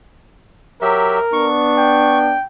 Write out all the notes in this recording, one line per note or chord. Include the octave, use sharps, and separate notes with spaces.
F#3 G4 A#4 E5
B3 D4 C#6
G5